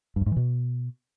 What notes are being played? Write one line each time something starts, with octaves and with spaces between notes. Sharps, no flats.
G2
F2
G#2
E3
B2